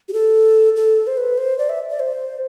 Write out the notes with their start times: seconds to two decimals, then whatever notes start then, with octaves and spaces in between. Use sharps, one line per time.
0.09 G4
0.13 A4
0.76 A4
1.07 C5
1.17 B4
1.38 C5
1.58 D5
1.69 E5
1.90 D5
2.00 C5